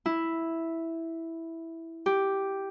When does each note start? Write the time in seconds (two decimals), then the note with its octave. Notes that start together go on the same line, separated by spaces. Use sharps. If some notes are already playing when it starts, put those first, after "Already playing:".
0.06 E4
2.06 G4